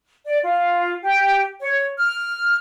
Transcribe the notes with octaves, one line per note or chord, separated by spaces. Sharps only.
D5
F4
G4
C#5
F6